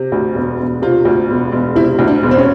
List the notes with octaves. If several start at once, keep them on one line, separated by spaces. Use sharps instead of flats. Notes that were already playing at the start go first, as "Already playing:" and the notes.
Already playing: C3
D2
E1
E1
C3 F4
D2
E1
E1
C3 E4
D2
D4
E1
C4
C#4